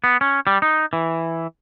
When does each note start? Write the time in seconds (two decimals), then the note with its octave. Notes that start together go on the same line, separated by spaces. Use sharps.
0.04 B3
0.21 C#4
0.47 G3
0.62 D#4
0.93 E3